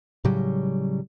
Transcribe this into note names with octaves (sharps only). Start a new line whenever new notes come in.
A2 C#3 F#3 G3